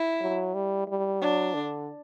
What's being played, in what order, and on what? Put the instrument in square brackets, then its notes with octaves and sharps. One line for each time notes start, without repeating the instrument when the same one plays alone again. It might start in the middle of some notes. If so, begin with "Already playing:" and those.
Already playing: [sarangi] E4
[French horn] F#3
G3
G3
[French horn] F#3 [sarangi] D4
[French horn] D3